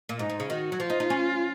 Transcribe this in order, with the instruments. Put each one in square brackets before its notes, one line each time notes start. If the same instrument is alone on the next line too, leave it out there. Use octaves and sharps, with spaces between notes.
[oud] A#2
[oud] G#2 [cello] D#4
[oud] G#2
C#3
[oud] D#3 [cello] F#4
[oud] F#3
[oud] F3 [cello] F4
[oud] D#4
D#4
C#4